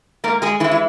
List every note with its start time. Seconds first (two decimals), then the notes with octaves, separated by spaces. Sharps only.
0.24 G#2 A#3 A#4
0.42 G#3 G#4
0.60 E3 E4
0.64 G#3
0.71 E4